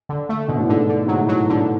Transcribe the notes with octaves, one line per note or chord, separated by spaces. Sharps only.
D3
A3
B2 D3
A2
G#2
A2 D3
D3
G#2 F#3
A2
B2 F#3
D3